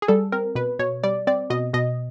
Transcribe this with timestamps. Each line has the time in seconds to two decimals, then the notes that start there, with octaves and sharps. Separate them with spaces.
0.02 G#4
0.08 G3 A4
0.32 C4 A#4
0.55 B2 B4
0.79 B2 C#5
1.03 G3 D5
1.27 C4 D5
1.50 B2 D#5
1.74 B2 D#5